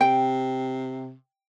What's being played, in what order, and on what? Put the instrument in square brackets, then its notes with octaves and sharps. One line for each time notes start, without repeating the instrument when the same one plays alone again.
[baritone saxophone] C3 [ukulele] G5